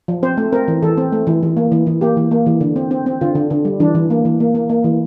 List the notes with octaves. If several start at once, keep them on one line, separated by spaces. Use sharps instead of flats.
F3
C4 C5
A3
C4 A#4
E3
E3 A4
C4
A3
E3
E3
A#3
E3
E3
A#3 G4
E3
A#3
E3
D3
C4
C4
C4
D3 F4
D3
D3
G3
E3 D4
E3
A#3
E3
A#3
A#3
A#3
E3